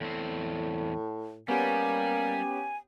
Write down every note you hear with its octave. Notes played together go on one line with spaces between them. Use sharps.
E2 A2 C4
G3 A#3 B3 C#4 G4 G#5